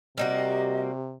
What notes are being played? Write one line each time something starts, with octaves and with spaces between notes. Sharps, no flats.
C3 G3 A#3 F#4 D#5